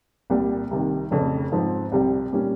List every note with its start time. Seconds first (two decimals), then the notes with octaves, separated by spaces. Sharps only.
0.30 C2 A#2 G3
0.71 C2 C3 D#3
1.11 F1 F2 C#3
1.52 G#2 F3 C4
1.92 C2 C3 G3
2.33 A#2 G3 C#4